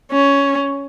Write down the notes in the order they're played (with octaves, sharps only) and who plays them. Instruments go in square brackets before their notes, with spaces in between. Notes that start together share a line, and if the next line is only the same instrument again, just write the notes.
[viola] C#4